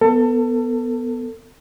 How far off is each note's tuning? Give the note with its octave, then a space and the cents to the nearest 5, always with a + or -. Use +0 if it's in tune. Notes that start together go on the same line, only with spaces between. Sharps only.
B3 +0 A4 +30